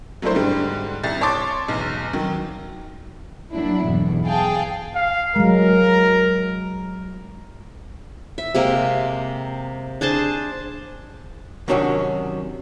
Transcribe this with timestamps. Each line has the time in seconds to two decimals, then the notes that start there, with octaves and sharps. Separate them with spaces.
0.22 F#3 A3 A#3 D4 E4 C5
0.35 G#2 D3 G3
1.03 C2 A6
1.21 C#5 A5 C6 D6 A6
1.68 B1 E2
2.13 D#3 F#3
3.52 F#3 A#3 D4 E4
3.84 B1 E2 G2
4.26 G#4 F5 G5 A5
4.95 F5
5.36 F#3 G#3 A#4
8.38 E5
8.55 C3 G#3 A#3 A#4
10.01 D4 G#4 C5 A5
11.68 F#2 C3 D#3 C#4 D4 F#4